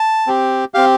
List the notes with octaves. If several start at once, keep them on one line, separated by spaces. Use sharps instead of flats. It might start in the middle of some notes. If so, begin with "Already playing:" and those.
Already playing: A5
C4 G4
C4 G4 F5